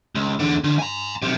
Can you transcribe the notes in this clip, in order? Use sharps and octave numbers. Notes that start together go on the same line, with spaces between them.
C#2
E2 D3
D3
G#5 A#5
B1 C3